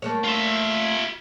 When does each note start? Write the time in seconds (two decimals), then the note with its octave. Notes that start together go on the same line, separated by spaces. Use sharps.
0.02 A3 A#3 C#5
0.24 F4 E5